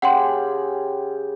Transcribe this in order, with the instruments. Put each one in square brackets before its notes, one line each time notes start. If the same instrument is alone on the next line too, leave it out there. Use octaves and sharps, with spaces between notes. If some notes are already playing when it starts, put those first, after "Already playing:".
[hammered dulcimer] C#3 G4 [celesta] F#5 G5 C6